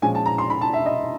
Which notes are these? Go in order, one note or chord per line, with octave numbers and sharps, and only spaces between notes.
A#2 F3 G#3 C#4 G#5
A5
A#5
C6
B5
A5
E5
D#5